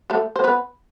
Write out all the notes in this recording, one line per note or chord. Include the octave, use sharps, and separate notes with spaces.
A3 A4
C5
B3 B4